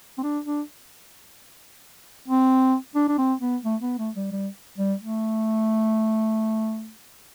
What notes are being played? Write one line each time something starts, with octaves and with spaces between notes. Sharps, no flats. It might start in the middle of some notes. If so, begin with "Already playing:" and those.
C4
D4
D4
C4
D4
D4
C4
B3
A3
B3
A3
G3
G3
G3
A3